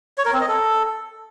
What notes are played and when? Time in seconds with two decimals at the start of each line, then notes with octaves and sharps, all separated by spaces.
0.18 C#5
0.25 A#4
0.33 C4
0.41 D#5
0.48 A4